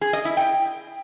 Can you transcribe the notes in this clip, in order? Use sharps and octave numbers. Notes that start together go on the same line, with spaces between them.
G#4
D#5
E4
G5